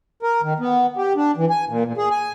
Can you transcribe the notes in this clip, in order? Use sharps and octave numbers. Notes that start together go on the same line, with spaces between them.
A#4
D#3
B3
G4
D4
E3
G#5
A#2
A#2
G#4
G#5